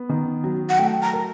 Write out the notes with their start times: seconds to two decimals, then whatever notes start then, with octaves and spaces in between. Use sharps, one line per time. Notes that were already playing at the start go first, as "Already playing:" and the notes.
Already playing: B3
0.09 D#3
0.44 F#3
0.70 F#5
0.79 A3 G5
1.02 A#5
1.13 A#4